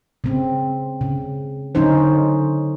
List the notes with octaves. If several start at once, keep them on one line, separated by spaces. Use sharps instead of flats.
C#3 C4
C#3
D3 F#3 C#4 D#4 C5